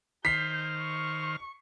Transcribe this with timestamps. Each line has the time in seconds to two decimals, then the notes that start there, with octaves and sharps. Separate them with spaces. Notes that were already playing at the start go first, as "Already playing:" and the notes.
0.25 D#3 C5 F6 G6 B6 C7
0.79 C#6